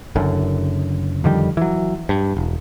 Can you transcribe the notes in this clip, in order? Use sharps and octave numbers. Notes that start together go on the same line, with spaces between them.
F#1 F#2 D3
F2 D3 D#3 G3
E3 F#3
G2
E1